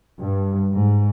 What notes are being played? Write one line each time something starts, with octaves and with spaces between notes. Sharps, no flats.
G2
G#2